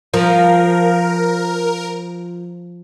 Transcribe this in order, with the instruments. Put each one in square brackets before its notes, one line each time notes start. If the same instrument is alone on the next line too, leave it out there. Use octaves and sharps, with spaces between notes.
[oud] F3 [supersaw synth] A#4